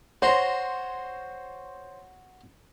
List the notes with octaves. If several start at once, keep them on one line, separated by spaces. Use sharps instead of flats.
F#4 C5 C#5 A#5 C6